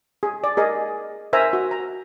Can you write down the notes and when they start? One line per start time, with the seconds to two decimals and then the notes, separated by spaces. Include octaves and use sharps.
0.23 G#4
0.44 D5
0.57 G#4 A#4 D#5
1.33 A#4 C5 E5 G#5 A#5
1.53 F#4
1.71 A#5